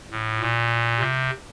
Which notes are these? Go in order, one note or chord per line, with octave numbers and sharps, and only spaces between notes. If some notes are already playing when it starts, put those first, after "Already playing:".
A2
A#2
C3